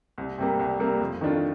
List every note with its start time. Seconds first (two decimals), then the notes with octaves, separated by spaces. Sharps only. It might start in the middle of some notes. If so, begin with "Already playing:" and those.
0.18 C2
0.38 C3 G3 A#3
0.59 C2
0.79 C3 G3 A#3
1.01 F2
1.21 D#3 A3 D4 F4